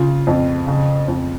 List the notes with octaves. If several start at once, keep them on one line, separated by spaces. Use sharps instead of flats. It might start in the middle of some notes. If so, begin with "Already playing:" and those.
Already playing: C#3 F4
F2
C#3
F2